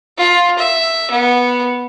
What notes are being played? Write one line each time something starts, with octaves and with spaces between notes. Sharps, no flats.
F4
E5
B3